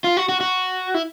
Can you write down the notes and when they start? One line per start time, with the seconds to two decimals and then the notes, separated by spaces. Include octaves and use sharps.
0.04 F4
0.17 F#4
0.29 F#4
0.41 F#4
0.94 E4